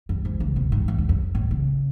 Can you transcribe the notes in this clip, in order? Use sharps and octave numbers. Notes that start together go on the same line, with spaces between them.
F#2
G#2
C#3
B2
G#2
E2
E2
F#2
A2
C#3